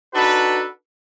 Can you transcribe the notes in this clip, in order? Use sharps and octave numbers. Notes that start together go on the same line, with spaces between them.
D4 D#4 F#4 A4 B4